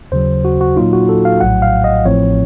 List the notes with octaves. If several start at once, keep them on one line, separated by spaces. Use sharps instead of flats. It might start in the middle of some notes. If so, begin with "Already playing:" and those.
D#2 C#3 F#3 C5
F#4
F#4
A#2 F#3 A#3 D#4 F4
F#4
A4
F5
A#1 A2 F#3 F#5
F5
D#5
A1 A2 F3 C4 C#5